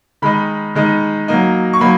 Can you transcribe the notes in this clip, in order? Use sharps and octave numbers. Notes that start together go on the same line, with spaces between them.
D#3 G#3 D#4 B5
D#3 G#3 D#4
F#3 A#3 D#4
C#6
F#3 A#3 D#4 B5